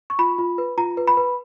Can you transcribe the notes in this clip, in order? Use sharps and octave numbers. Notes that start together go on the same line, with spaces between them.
C#6
F4 B5
F4
B4
F4 A#5
B4
B5
B4